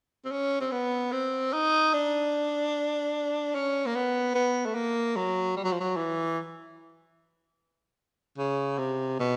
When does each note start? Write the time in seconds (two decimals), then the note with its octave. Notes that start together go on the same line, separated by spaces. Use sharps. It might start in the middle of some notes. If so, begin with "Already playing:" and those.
0.25 C4
0.31 C#4
0.61 C4
0.72 B3
1.12 C4
1.53 D#4
1.93 D4
3.54 C#4
3.86 A#3
3.95 B3
4.34 B3
4.66 A3
4.75 A#3
5.16 F#3
5.57 G3
5.64 F#3
5.72 F3
5.80 F#3
5.96 E3
8.38 C#3
8.78 C3
9.19 B2